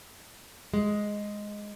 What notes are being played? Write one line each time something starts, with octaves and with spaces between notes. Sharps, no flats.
G#3